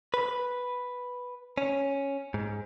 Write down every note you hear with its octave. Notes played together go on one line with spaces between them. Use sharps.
B4
C#4
G#2